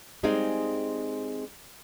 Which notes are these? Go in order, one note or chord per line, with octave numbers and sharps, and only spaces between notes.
G3 G#3 C4 D#4 G#4 F5